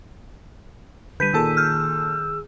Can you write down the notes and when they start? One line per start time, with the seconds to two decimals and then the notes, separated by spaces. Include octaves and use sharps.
1.20 D3 G3 B4 G6 B6 D#7
1.34 A#2 D#3 G#4 A4 A5 E6
1.57 F6 G6